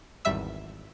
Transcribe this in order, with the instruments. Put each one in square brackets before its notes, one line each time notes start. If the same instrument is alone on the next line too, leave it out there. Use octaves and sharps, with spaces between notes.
[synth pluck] G#1 E2 G3 E5 E6